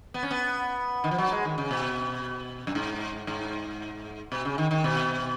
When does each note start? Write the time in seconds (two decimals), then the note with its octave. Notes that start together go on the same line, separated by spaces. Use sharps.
0.14 B3
0.23 C#4
0.31 B3
1.04 D#3
1.11 F3
1.18 F#3
1.32 G#3
1.45 D#3
1.58 C#3
1.71 B2
2.67 F#2
2.75 G#2
3.27 G#2
4.32 B2
4.45 C#3
4.58 D#3
4.71 D#3
4.84 B2